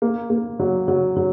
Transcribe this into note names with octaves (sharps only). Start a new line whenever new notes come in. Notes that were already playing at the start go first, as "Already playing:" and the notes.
A#3
A#3
F#3
F#3
F#3